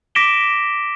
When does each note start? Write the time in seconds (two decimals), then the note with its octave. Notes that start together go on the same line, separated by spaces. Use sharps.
0.15 D6 A#6 B6 D7 E7 G7